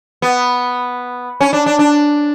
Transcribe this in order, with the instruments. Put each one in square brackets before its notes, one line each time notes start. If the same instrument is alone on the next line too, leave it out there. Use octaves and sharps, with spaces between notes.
[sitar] B3
C#4
D4
D4
D4